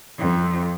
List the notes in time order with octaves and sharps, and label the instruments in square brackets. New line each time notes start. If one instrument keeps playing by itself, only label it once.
[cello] F2